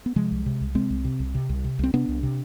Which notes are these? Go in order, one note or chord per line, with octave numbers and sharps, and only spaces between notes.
B3
C3 F3 G#3
C2
C3
C2
C3 G#3 C4
C2
C3
C2
C3
C2
C3
C2 C4
C3 B3 D4
C2
C3